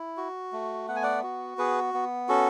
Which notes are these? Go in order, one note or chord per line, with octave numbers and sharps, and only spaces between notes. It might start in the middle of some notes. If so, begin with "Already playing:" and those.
Already playing: E4
F#4
A3
B3 F#5
G#5
D5 F#5
F#4
B3 G#4 B4
B3
C#4 F#4 A4